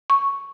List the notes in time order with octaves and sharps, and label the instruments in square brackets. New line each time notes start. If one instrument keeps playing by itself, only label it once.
[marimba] C#6